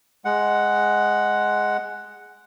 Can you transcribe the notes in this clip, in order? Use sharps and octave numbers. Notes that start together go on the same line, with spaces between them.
G#3 F#5